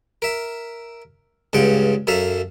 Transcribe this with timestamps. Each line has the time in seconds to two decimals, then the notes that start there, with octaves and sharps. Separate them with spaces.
0.22 A#4 E5
1.53 C#2 G2 C#3 F#5 G5
2.07 F#2 F#3 A4 E5 F5